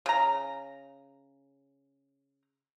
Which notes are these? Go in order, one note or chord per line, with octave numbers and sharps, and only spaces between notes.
C#3 A#5